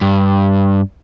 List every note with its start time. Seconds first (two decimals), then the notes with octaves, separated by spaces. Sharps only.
0.01 G2